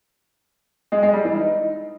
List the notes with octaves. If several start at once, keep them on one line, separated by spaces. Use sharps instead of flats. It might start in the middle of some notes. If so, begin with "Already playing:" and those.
G#3
G#3
G3
E3
D#4